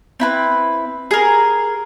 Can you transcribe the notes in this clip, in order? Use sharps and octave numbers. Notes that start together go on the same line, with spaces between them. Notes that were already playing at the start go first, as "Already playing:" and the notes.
C4 E4 B4
G#4 A#4